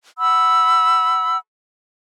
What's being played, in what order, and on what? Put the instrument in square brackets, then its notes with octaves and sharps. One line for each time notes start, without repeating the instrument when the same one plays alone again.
[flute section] F#5 B5 E6